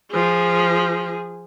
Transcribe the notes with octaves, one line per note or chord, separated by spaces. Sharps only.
F3 G#4